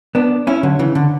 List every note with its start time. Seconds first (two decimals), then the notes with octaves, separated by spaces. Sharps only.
0.15 B3 D4
0.47 C#4 E4
0.63 D3 F#3
0.79 C#3 E3
0.95 D3